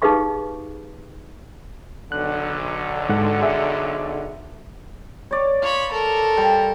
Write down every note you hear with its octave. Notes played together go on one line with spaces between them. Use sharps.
D#4 G4 G#4 B4 F5 C#6
B1 D3 F#6
G#2 A4 F#5
G#4 E5
C#5 D5
F4 C#5 B5
A4 A#4
G3